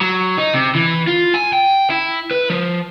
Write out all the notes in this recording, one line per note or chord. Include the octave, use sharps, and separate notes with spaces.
F#3
D#4
C3
E3
F4
G#5
G5
E4
B4
F3